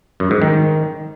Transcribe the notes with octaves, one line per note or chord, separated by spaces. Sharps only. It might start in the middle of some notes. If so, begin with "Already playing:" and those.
F#2
G#2
D#3